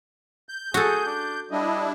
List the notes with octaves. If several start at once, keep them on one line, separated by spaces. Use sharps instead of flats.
G6
F#4 G#4 A4
D4
G3 D4 E4 D#5